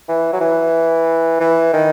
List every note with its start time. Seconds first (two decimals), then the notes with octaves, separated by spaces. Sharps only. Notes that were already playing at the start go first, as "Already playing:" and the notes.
0.09 E3
0.33 F#3
0.41 E3
1.40 E3
1.73 D#3